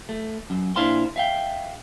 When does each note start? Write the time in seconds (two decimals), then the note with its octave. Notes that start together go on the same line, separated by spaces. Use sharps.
0.09 A3
0.50 F#2
0.76 A#2 D4 E4 C5 F5 C6
1.16 E5 F5 G5